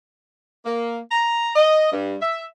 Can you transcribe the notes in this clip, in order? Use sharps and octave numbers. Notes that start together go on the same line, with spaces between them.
A#3
A#5
D#5
G2
E5